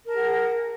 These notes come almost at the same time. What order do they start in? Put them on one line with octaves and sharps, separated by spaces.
A#4 A5 G#4 F#5